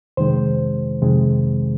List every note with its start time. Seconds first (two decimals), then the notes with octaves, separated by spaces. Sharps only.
0.17 F2 C3 D#3 G#3 C5
1.02 F2 C3 D#3 G#3